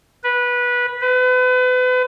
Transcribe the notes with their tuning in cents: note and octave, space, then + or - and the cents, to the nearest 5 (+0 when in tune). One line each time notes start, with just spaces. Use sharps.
B4 -15
B4 +35